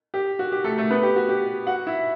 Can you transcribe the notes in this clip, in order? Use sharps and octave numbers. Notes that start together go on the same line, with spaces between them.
G4
F#4
G4
A3 A4
A3 A4
B3 B4
G4
F#4
G4
F#4 F#5
E4 E5